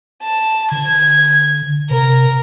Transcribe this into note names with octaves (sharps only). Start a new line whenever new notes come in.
A5
D3 G#6
C3 A#4